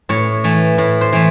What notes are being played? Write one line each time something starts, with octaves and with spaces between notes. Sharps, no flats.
A2 C#5
E3 A3
A2
C5
E3 A3